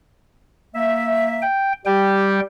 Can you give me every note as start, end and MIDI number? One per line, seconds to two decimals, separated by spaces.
0.75 1.44 58
0.75 1.44 76
1.42 1.73 79
1.86 2.40 55
1.86 2.41 67
1.86 2.40 79